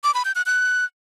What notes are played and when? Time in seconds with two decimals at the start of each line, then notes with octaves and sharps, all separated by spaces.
0.04 D6
0.14 B5
0.25 G6
0.35 F#6
0.46 F#6